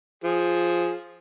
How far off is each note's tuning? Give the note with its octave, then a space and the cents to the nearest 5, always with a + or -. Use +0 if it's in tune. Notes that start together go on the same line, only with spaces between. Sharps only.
F3 +0 G#4 +0